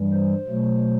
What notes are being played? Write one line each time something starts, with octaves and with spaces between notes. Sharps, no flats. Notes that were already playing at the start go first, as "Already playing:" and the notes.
Already playing: G2 E3 G3
C5
B2 F#3 A3